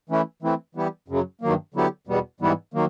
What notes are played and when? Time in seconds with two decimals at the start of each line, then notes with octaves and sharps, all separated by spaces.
0.10 E3 A3 C#4 E4
0.42 E3 A3 C4 E4
0.75 E3 G3 B3 E4 G4
1.08 F#2 C#3 F#3
1.41 G2 D#3 F#3 A#3
1.74 D3 F#3 B3 E4 G4
2.07 E2 B2 G3 B3
2.40 G#2 E3 G3 B3 E4
2.74 D#3 F#3 A#3